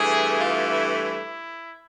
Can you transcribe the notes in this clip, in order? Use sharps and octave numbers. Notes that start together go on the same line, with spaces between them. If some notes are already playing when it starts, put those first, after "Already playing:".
Already playing: G2 E3 A3 G#4
F4
E4
E4